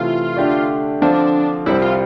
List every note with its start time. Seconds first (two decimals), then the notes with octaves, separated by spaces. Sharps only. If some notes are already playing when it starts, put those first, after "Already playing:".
Already playing: C3 E3 A3 F4
0.37 D3 A3 D4 G4 D5
1.02 D3 F3 C4 D4 F4 A4
1.66 C2 C3 G3 C4 E4
1.82 F4